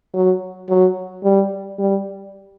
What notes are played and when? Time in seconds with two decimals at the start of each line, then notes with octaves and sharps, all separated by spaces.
0.14 F#3
0.69 F#3
1.24 G3
1.79 G3